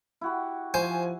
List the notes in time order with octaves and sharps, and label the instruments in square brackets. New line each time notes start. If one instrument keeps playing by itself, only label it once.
[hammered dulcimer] E4 F#4 G4
[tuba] F3 [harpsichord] C5 [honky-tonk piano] G#5